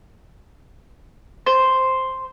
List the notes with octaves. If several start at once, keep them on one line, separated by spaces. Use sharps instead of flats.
C5